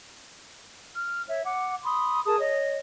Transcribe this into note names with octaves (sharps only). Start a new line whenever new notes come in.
F6
C#5 E5
F#5 D6
B5 C6 D#6
G#4 A#4 A5 D#6
C#5 D#5